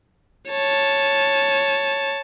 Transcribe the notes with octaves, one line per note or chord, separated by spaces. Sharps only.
C#5 A5